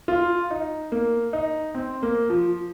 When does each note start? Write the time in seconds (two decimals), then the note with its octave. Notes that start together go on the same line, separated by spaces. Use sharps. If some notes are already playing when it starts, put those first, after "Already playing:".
0.08 F4
0.51 D#4
0.92 A#3
1.33 D#4
1.75 C4
2.03 A#3
2.30 F3